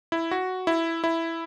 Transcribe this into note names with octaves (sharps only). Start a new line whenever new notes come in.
E4
F#4
E4
E4